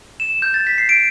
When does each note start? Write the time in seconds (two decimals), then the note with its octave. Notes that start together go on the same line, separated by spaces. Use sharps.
0.20 E7
0.42 G6
0.54 A6
0.67 B6
0.78 C7
0.89 D7